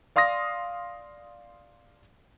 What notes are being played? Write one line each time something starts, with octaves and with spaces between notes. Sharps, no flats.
D5 F5 C6 D#6 A#6